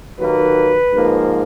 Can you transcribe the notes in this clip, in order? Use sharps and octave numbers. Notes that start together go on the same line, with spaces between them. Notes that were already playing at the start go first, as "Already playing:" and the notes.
D#2 D#3 F#3 A#3 B4
G#2 F3 A#3